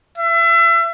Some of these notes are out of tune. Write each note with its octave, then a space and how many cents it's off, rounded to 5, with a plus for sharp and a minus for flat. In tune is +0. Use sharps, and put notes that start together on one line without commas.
E5 +35